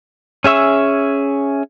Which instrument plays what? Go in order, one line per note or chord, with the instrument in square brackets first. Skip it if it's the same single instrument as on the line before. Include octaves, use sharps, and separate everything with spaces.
[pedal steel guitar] C#4 G#4 E5 C#6 E6